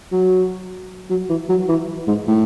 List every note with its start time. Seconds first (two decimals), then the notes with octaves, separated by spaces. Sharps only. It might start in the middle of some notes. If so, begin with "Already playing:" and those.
0.12 F#3
1.10 F#3
1.29 E3
1.49 F#3
1.69 E3
2.08 G#2
2.28 A2